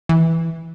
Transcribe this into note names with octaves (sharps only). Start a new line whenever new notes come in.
E3